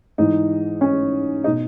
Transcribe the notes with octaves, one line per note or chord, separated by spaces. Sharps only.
G#2 E3 D#4
C#4
D#4
B2